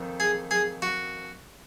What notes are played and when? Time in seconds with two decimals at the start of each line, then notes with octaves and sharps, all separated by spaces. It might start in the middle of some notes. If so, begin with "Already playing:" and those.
Already playing: F2 D#3
0.20 G#4
0.51 G#4
0.82 F#4